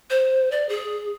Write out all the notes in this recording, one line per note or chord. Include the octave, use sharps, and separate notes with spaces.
C5
D5
G#4